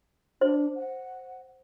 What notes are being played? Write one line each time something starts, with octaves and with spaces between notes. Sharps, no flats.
D4 C5
F#5